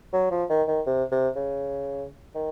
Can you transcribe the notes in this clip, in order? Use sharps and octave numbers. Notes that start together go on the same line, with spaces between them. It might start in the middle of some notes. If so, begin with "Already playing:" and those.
F#3
F3
D#3
D#3
C3
C3
C#3
D#3